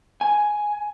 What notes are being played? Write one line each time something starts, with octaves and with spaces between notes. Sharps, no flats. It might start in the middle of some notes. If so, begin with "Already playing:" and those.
G#5